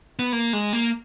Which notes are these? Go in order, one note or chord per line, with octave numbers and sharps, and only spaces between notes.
B3
A#3
G#3
A#3